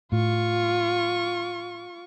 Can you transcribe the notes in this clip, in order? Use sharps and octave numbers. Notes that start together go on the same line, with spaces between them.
A2 F4 C#6